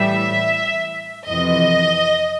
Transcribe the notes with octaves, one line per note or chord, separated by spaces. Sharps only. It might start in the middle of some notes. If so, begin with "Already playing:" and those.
Already playing: A2 E3 G3 E5
F2 C3 E3 D#5